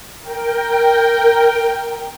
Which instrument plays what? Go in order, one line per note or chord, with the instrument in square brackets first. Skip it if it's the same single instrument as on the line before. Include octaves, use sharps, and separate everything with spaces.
[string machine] A#4 G5